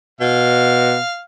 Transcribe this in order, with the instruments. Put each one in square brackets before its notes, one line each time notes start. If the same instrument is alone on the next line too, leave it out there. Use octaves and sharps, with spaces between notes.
[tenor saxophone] B2 [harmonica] F5